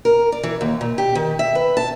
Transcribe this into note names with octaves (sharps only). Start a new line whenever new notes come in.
A#4
D5
E3
D#2
A#2
G4
D#3
E5
B4
A5